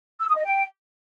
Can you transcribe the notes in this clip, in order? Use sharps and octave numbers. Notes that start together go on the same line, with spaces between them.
E6
D#6
D#5
G5